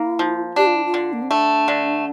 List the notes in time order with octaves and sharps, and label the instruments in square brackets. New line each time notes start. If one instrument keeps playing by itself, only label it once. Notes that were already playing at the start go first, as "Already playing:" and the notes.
Already playing: [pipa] A#3 [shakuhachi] E4
[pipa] F3
[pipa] D4 [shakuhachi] G4
[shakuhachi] F4
E4
F4
[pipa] D3
[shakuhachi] A#3
C4
[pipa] A3 [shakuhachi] D4
[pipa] D3